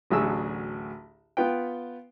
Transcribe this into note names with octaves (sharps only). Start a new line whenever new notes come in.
A1 D2 F#3 F#4 G#4 E6
B3 F4 B4 G5